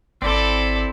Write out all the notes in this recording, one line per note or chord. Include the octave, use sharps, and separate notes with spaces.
G#1 C4 E4 A4 C5 D5